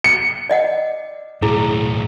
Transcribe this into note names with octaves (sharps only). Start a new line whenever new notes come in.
C#7
D5 D#5 F#5
B1 A2 E4 G#4